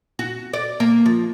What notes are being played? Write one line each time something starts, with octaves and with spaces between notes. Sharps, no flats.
F#4
D5
A#3
F3